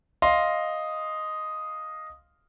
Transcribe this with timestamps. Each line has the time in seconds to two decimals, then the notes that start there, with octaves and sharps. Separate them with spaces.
0.22 D#5 F5 C6